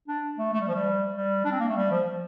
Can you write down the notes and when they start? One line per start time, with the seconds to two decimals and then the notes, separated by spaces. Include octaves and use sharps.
0.08 D4
0.38 A3
0.53 A3
0.60 G3
0.68 F3
0.75 G3
1.15 G3
1.44 D4
1.52 C4
1.60 A#3
1.68 A3
1.76 G3
1.91 F3